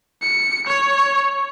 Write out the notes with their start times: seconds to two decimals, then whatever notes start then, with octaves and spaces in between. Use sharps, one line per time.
0.22 C#7
0.67 C#5